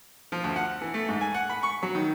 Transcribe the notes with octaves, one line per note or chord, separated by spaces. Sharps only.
F3
D2
F#5
E3
A3
G#2
G#5
F#5
B5
C#6
F#3
D#3